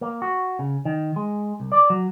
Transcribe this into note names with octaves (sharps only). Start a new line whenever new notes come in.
A#3
F#4
C#3
D#3
G#3
C2
D5
F#3